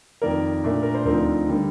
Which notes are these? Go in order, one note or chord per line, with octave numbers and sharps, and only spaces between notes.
F2 D#3 A#3 A#4 D5
A#2 A3 D4
A#4
C5
D2 D3 F3 C4 D#4 A#4 D5
D3 G3 A#3